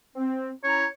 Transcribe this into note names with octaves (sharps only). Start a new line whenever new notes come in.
C4
C#4 E4 C#5 A#5